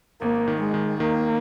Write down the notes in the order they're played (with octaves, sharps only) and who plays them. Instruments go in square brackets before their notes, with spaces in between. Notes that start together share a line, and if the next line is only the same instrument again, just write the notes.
[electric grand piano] G#1 [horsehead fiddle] A#3
[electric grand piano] D#3
[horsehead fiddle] G#3
[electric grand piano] D#3
[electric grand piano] D#3 [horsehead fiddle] A#3